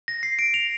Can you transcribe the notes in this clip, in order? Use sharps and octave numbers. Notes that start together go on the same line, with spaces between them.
A#6
C7
D7
F7